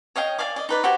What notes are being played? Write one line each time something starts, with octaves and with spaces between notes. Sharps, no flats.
C#5 D#5 F5 G5
D5 F5 G#5 D6
D5 D#5
D#4 B4 D5
F#4 G4 C5 G#5